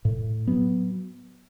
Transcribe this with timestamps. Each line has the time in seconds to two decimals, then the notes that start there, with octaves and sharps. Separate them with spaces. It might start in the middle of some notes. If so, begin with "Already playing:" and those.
0.05 A2
0.47 F#3 B3